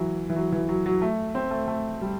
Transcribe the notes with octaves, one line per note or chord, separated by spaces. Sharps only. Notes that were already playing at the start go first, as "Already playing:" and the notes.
Already playing: E3 F#3
E3
F#3
E3
F#3
F#3
A3
C4
A3
A3
G3